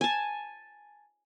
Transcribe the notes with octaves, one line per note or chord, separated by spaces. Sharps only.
G#5 A5